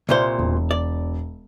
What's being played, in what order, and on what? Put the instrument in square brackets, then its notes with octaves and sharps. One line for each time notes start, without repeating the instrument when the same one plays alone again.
[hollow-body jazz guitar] C2 A#2 C5 [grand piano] D5
[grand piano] E1
[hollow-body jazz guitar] D5